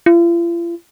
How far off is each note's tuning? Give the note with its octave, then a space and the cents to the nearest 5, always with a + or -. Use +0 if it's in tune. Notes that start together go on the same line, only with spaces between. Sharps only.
F4 -45